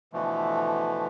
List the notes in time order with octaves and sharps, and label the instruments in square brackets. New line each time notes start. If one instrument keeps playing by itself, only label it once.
[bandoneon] B2 D3 E3 F3 A3